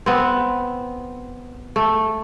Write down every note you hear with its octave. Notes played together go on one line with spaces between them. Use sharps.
B3 C4
A3